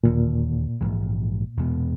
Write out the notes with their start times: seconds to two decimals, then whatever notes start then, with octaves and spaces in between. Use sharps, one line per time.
0.03 E1 D#2 A#2 D3
0.81 A#1 G#2 E3 G#3
1.57 E2 B2 G#3 B3